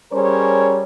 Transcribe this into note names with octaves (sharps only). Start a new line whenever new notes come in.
G3 C#4 G#4 A#4 C5 C#5